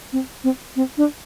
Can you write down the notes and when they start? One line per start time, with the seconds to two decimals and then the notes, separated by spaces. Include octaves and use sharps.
0.13 C4
0.44 C4
0.76 C4
0.97 D4